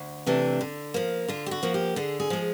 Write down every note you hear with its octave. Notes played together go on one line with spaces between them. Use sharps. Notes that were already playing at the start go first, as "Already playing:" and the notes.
Already playing: D2
C3 E3 A3 D4
D3
F3 A#3
D3 F4
G4
F#4
F3 A#3
G4
D3 G#4
G#4
F3 G#3